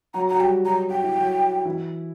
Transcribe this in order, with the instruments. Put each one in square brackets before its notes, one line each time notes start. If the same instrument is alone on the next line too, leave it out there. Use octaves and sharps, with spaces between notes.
[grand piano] F#3 F#4 [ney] A#5
[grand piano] F#4 [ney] A#5
[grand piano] G3 G4 [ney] G5
[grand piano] F#3 F#4 [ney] A#5
[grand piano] F#4 [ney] G5
[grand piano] E4
F#3 F#4
E3 E4